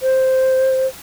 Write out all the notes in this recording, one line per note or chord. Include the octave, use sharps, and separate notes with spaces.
C5